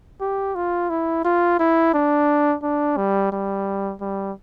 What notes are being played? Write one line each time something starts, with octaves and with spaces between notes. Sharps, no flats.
G4
F4
E4
F4
E4
D4
D4
G3
G3
G3